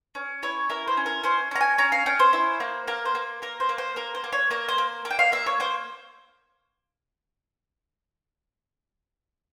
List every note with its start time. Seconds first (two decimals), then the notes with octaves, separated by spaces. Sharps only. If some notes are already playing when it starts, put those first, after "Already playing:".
0.15 C#4
0.43 E4 C#5
0.70 E4 A#4
0.88 C5
0.97 C#4
1.06 A#4
1.24 C#4 C5
1.51 C#4 A#5
1.61 G#5
1.78 C#4 A#5
1.92 F5
2.06 C#4 G5
2.19 C5
2.33 E4
2.60 A#3
2.87 A#3 A#4
3.05 C5
3.15 A#3
3.42 A#3 A#4
3.60 C5
3.69 A#3
3.78 C5
3.96 A#3 A#4
4.15 C5
4.24 A#3
4.32 C#5
4.50 A#3 A#4
4.69 C5
4.78 A#3
5.05 A#3
5.10 G5
5.19 F5
5.32 A#3 E5
5.46 C#5
5.60 A#3 C5